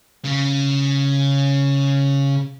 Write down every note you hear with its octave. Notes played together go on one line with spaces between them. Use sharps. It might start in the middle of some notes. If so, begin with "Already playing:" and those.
C#3 C#4